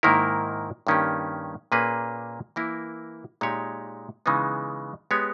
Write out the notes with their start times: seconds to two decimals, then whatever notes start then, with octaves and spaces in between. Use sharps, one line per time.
0.03 G#2 D#3 A#3 E4 A#4
0.87 G2 D#3 A#3 C#4 G4
1.72 A#2 A#3 C#4 G#4 B4
2.56 E3 A#3 E4 A#4
3.41 A#2 G#3 D#4 G4 C#5
4.26 C#3 E3 G#3 B3 D#4
5.11 G#3 B3 G4 C#5